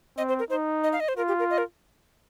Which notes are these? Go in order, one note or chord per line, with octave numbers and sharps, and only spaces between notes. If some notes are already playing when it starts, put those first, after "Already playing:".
C4 D#5
C5
A#4
D#4 C5
D#5
F5
D#5
C5
F4 A#4
G4
A#4
D#5
A#4